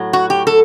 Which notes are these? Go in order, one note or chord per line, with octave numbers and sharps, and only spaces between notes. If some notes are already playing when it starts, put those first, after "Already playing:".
Already playing: A2 F#3
F#4
G4
A4